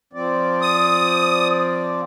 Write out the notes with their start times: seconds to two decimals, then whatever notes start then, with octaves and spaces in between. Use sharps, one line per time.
0.13 F3 C4 D5
0.62 D#6